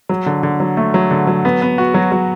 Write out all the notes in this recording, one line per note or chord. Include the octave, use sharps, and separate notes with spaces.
F#3
D3
D3
F#3
A3
F#3
D3
F#3
B3
B3
F#4
F#3
F#3